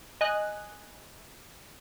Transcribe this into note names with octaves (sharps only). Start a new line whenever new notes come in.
D#5 G#5 F#6